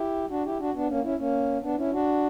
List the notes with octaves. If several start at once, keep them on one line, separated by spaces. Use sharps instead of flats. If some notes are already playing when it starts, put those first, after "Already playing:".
Already playing: E4 G4
D4 F#4
E4 G4
D4 F#4
B3 D4
A#3 C#4
C#4 E4
A#3 C#4
B3 D4
C#4 E4
D4 F#4